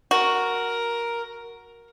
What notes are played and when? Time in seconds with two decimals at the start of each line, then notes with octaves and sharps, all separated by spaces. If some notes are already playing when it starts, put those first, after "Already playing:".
0.11 F#4 A#4